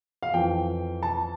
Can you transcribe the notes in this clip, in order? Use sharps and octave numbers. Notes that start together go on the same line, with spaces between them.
F5
F2 E3 G5
A5